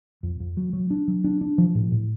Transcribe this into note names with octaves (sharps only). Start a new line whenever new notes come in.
F2
F2
F#3
F#3
D4
F#3
D4
D4
F3
A2
A2